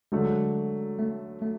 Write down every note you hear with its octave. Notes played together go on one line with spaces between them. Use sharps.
D3 F#3 G#3 A3
A3
A3